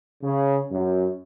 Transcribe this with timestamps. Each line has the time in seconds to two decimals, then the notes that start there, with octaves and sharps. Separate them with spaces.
0.23 C#3
0.72 F#2